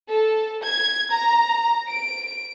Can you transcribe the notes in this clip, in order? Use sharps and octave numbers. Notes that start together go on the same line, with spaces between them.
A4
G#6
A#5
D7